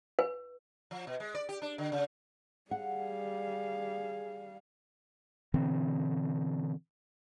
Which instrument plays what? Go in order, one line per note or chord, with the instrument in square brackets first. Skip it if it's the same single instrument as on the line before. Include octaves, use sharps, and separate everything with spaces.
[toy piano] B4
[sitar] F3
B2
G#3
D5
G4
D4
D3
C#3
[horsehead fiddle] G3 F5 [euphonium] G#4 [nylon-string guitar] F#5
[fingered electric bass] B2 D3 E3 C4